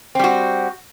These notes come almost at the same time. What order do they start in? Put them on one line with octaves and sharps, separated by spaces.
C4 G3 F#4